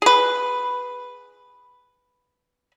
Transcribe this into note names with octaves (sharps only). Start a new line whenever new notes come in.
G#4 B4